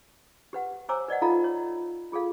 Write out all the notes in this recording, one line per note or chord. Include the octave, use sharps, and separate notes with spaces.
G4 B4 F#5
C5 C#5 G#5 A#5 D6 E6
B4 D5 D#5 F#5
D#4 F4 A4 F5 A#5
C#5
F4 G#4 A4 F5